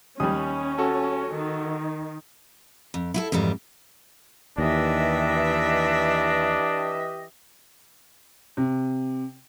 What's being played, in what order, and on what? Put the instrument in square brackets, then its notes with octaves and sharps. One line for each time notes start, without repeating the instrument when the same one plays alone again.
[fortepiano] D#2 G3 [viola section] C#4 [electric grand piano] D#6
[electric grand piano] F#4 A4 A5
[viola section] D#3
[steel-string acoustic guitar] F2
E4 F4 A4
F2 G#2 E3 G3
[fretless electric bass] D#2 [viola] E3 E5 [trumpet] D4 [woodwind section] G4 B4 D#5
[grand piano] C3